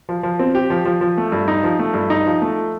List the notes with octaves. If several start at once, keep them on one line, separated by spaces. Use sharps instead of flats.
F3
F3
C4
G4
F3
F3
F3
A3
G2
D#4
F3
A3
G2
D#4
F3
A3